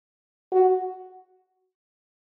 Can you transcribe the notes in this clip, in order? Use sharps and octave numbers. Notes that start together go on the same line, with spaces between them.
F#4